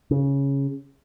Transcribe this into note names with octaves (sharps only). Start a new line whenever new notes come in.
C#3